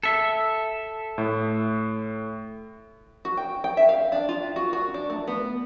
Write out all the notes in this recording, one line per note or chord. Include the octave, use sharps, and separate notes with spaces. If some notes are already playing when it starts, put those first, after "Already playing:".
A4 E5
A2
F#4
G5
G5
E5
F5
D4
F4
F#4
F#4
D4
A3
B3